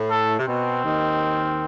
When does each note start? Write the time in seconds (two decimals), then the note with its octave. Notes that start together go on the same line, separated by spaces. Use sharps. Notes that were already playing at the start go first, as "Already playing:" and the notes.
Already playing: A2
0.10 A4
0.38 C3
0.47 B2 C4
0.84 D#2 D#3